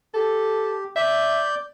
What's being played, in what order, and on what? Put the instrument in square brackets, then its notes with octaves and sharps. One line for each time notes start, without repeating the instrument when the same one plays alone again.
[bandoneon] G4 [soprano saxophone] A4
[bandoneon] D5 G6 [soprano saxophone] E5